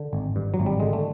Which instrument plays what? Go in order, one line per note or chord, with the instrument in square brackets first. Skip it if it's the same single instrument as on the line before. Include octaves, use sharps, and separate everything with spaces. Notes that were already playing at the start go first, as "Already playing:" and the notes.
Already playing: [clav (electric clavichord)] D3
G#1
G2
F#3
G#1
G3
D3 G#3
A3